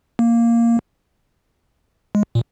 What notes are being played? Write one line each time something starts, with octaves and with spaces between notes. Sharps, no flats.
A#3
G#3
A#2